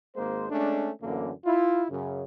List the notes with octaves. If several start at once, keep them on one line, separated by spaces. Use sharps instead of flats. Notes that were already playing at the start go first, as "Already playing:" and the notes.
G#1 G#3 A#3 C5
G#3 A3 C#4 D4
F#2 A2 D3 E3 A#3
E4 F4
F#2 C#3